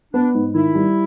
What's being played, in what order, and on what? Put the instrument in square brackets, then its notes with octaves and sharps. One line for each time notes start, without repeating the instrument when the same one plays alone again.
[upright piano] B3 [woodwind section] D4
[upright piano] G#2
[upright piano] D#3 [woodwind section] E4
[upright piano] G3